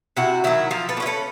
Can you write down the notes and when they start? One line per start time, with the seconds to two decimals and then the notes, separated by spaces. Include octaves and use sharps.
0.17 C3 E4 F#4
0.44 D#3 F#3 E4
0.71 F3 F4
0.89 A4 B4
0.97 A#3
1.00 C#4 E4
1.06 A4 B4